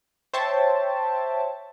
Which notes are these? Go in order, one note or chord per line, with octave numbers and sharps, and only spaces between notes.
C5 C#5 E5 G5 A5